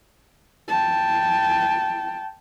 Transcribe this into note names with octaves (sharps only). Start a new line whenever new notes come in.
G5 A5